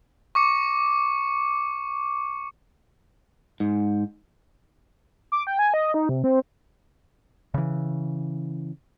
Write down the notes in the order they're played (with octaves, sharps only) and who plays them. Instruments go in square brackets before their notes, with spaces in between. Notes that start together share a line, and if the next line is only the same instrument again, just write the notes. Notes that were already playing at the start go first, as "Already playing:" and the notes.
[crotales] C#6 D6 C#7
[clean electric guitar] G#2
[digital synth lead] D6
G5
G#5
D#5
D#4
C3
C4
[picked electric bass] C#3 E3